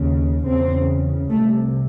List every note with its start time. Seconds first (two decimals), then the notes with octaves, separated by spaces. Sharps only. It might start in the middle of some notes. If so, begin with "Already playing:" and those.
Already playing: D#2 C#3
0.44 E2 C#3 C4
1.30 C2 C3 A3